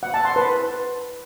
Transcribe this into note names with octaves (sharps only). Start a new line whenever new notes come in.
F#5
A5
C6
B4